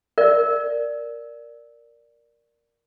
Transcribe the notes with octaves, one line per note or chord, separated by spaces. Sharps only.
A#4 D5